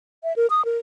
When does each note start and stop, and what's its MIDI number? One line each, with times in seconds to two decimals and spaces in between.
0.24 0.35 76
0.36 0.46 70
0.50 0.65 87
0.65 0.78 70